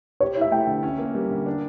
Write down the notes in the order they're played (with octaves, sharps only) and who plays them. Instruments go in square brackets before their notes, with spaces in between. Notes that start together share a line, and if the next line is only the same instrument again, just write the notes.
[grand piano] G4 [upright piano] C#5
[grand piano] E4
[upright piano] E5
[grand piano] A3 [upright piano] G5
[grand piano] D3
C#4
A#3
G3
D3
D4